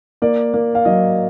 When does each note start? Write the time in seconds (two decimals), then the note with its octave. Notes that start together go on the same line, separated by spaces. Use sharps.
0.22 A#3 D5
0.54 A#3
0.75 F5
0.85 F#3 D#5